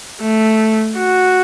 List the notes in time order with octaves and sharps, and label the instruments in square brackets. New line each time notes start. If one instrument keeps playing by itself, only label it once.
[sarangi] A3
F#4